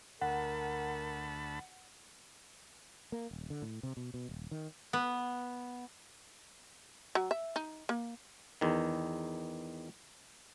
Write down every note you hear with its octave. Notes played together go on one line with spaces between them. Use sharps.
D2 A#4 F#5 A5 B5
A#3
D#1
D3
A2
C3
B2
B2
D#1
D#3
B3
F#3
E5
D#4
A#3
E2 D#3